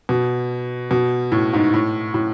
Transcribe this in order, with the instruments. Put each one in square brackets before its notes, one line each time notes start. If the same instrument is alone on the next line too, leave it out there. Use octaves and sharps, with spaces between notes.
[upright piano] B2
B2
A2
G#2
A2
A2